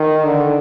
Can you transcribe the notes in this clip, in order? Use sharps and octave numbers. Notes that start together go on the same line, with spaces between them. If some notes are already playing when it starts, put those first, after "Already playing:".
Already playing: D#3
D3